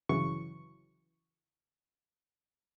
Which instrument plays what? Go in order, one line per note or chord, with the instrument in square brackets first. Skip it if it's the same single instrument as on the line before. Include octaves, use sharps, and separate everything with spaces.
[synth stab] G1 C#3 E3 F#3 C#6